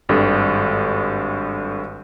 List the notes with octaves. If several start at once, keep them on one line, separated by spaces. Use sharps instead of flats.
G#1 G2 A4